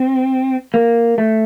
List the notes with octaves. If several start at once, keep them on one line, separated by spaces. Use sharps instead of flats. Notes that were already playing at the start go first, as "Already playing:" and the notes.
Already playing: C4
A#3
A3